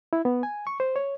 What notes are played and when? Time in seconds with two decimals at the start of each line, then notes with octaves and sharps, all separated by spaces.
0.13 E4
0.25 B3
0.43 G#5
0.67 C#6
0.80 C5
0.96 C#5